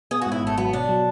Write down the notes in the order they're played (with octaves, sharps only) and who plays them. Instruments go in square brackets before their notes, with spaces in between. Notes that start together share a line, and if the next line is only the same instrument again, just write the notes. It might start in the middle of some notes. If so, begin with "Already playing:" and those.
[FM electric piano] B3 [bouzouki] G#4
[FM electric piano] G#2 [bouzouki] F#4
[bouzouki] E4
[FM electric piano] G#1 [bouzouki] A3
[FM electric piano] F#3 [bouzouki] B3
[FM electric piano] B2 [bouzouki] D4
[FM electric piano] F#3